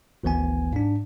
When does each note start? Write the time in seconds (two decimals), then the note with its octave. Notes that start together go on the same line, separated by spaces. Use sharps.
0.23 G#1 D2 E3 B3 G#5
0.73 G#2 D4